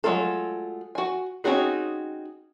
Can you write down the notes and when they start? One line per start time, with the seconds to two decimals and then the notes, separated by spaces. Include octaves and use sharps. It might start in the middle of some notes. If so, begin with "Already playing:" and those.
0.04 F#3 G#3 A3 F4 A4
0.95 F#4 G#5
1.44 C4 C#4 D#4 F#4 G#4